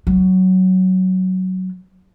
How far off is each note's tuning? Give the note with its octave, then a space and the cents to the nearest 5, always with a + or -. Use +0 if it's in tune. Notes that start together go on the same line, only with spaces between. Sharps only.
F#3 +10